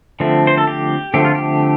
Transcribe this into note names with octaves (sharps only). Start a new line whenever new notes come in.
D3 F3 A3 C4
C5
A4
G4
D3 F3 A3 C4 G4
F4
G4